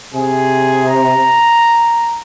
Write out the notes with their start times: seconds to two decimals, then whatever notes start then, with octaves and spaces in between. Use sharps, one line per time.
0.14 C3 G#4
0.88 A#5